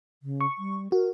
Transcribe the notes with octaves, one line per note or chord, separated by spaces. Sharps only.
C#3
C#6
G3
F#4 A#4